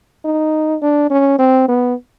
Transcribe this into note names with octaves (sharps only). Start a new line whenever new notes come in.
D#4
D4
C#4
C4
B3